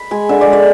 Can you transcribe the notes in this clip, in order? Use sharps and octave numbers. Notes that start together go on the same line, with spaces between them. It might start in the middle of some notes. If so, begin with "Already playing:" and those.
Already playing: B5
G#3 G#5
D3 E5
D5
G#3
D5